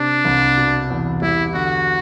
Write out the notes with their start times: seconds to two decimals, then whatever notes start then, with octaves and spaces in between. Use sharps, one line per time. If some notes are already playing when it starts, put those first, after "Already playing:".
Already playing: C3 D4
0.25 C2
0.57 B2
0.90 E2
1.22 G3 E4
1.54 D3 F#4